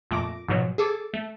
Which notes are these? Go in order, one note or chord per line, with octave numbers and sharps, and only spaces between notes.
F2 A#2 A3 D6 A#6 D7
G#2 B2 F3 F#3
G#4 A4 D6
A3